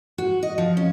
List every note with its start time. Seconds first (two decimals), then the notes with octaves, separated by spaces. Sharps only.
0.18 F#4
0.43 D#5
0.58 F3
0.77 C#4